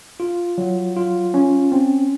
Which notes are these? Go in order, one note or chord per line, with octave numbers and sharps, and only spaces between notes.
F4
F#3
F4
C#4
C4